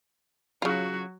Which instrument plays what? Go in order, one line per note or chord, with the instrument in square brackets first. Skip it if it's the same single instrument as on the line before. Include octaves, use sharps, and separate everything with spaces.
[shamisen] C#3 F4 [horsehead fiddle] F#3 F#4